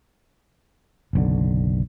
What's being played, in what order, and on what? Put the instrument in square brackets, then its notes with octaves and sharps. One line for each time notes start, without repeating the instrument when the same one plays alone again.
[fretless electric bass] F#1 B1 D3